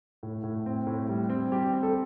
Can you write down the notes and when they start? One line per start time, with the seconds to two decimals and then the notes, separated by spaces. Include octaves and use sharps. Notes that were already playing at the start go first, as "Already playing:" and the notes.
0.23 A2
0.43 A2
0.66 C4
0.87 A2
1.09 G3
1.29 C4
1.52 G3 G4
1.73 C4
1.83 A4